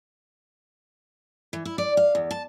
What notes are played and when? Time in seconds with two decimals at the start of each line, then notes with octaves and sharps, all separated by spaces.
1.53 E3
1.65 E4
1.78 D5
1.97 F5
2.15 E2
2.31 A5